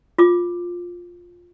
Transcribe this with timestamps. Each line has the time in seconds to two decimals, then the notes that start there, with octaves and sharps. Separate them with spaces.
0.18 F4 D6